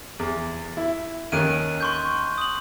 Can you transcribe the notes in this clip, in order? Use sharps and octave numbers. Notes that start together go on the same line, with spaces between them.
E2
E4
D#2 D#3 C#4 F#6 D7 D#7
C6 C#6 G6
D#6 F#7